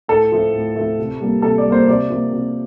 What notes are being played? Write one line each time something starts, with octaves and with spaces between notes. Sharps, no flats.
A2 A4
F3 A3
A2
F3 A3
C3
G3 A#3
C3 A4
D5
G3
A#3 C5
C3 D5
F3 A#3
C3